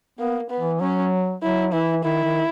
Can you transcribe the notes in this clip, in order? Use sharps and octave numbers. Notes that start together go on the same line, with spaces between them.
A#3 B3
B3
E3
F#3 C#4
F#3 E4
E3 E4
D#3 E4
D#3